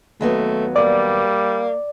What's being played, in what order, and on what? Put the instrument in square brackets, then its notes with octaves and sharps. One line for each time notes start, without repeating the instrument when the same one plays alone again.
[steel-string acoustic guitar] D#2 F#3 B3 [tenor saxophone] A3
[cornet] G3 [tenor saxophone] A#3 [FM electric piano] D5